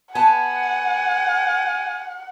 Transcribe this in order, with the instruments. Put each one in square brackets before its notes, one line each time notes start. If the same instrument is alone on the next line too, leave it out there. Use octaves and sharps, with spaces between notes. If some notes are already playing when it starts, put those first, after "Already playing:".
[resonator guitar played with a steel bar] B3 A5 [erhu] F#5 [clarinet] G#5